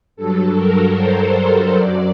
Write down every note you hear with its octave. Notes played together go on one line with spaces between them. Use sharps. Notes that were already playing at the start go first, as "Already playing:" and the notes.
G2 F#3 A4
A#4
C5
F#2 F#3 D5